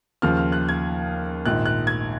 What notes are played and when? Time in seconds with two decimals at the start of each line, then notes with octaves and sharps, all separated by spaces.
0.22 D#2 C#3 F3 F6
0.37 F6
0.52 F#6
0.69 G#6
1.45 A#1 G#2 D#3 F#6
1.66 F#6
1.87 G#6